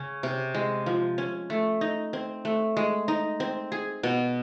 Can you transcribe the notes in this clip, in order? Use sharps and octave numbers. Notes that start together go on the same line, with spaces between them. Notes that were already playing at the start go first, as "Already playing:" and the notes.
Already playing: C#3 C#4
C3
G#3
F3
C#4
A3
D#4
C4
A3
G#3
D#4
C4
G#4
B2